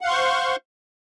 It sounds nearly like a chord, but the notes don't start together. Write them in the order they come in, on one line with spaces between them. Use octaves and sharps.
F#5 F5 C6 C#6 C5